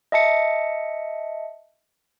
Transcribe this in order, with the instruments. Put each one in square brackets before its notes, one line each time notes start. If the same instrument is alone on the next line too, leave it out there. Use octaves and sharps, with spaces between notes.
[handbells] D#5 E5 A5 C#7